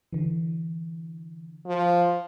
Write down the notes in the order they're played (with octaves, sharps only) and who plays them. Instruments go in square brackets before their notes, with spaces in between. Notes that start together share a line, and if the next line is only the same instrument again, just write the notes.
[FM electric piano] D3 E3
[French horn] F3